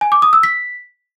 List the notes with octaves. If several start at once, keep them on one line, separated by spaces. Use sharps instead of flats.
G#5
D6
D#6
E6
B6